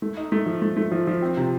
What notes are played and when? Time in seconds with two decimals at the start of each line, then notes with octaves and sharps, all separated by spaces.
0.02 A3
0.17 D#4
0.32 A3
0.46 F3
0.62 A3
0.77 A3
0.92 F3
1.07 F3
1.22 C4
1.37 C3